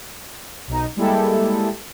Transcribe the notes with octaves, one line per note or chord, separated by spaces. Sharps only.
B1 D#4
G3 G#3 A#3 E4 G4 A4